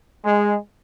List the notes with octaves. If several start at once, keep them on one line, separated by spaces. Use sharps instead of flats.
G#3